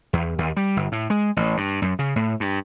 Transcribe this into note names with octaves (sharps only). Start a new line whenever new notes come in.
E2
D#2
G3
G1
A2
G#3
A1
G2
F#2
C#3
A2
G2